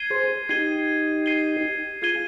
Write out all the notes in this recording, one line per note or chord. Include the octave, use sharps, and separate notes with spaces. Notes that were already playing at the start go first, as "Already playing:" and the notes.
Already playing: G#6 C7 D#7 G7
G#4 C5
D#4 G4 G#6 C7 D#7 G7
G#6 C7 D#7 G7
F4 G#4 G#6 C7 D#7 G7